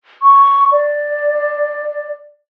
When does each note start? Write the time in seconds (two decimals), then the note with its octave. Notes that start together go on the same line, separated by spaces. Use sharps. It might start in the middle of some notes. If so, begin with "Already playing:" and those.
0.22 C#6
0.72 D5